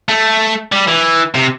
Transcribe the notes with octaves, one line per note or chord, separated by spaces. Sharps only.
A3
G3
E3
C3